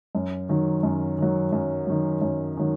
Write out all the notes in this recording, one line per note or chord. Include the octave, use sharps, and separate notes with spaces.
F#2
D#3 F#3
F#2
D#3 F#3
F#2
D#3 F#3
F#2
D#3 F#3